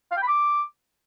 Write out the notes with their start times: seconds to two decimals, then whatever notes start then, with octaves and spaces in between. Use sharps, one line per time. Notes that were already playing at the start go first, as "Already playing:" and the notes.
0.11 F5
0.17 G5
0.22 B5
0.28 D6